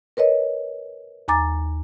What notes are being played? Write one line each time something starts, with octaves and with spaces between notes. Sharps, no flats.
A#4 B4 C#5 D#5
D#2 G#5 A#5 D6 A6